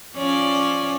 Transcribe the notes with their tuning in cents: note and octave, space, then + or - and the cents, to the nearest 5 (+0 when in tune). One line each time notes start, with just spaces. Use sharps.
F3 +0 C#4 +0 D5 +0